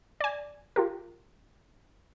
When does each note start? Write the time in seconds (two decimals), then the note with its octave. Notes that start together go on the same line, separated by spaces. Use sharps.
0.20 D5 G#5
0.76 F4 G4 A#4